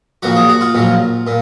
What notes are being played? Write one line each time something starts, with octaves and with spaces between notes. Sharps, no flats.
A#1 A#2 F#3 F#4
G#4
F#4
F4
A#1 A#2 F#3
A#2